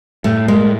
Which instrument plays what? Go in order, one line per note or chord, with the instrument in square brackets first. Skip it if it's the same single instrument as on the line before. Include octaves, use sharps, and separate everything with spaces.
[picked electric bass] A2 [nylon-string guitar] A3
[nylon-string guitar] G#3 [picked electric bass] A#3